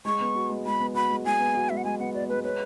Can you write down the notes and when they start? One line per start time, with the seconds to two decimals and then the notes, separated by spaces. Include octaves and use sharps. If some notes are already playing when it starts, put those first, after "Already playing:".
0.05 G#3 C#6
0.21 B3
0.35 F#4
0.50 G#3
0.66 G#3 B5
0.80 B3
0.94 F#4 B5
1.10 G#3
1.25 G#3 G#5
1.40 B3
1.54 F#4
1.70 G#3 E5
1.77 F#5
1.84 G#3 G#5
1.99 B3 F#5
2.14 F#4 D5
2.29 G#3 B4
2.44 B4 C#5